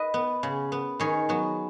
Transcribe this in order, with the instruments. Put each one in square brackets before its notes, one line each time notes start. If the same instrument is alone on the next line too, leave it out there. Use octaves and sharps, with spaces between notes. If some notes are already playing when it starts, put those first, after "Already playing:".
Already playing: [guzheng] B4 D#5
B3
C#3
B3
D#3 G#4 C#5
F#3 B3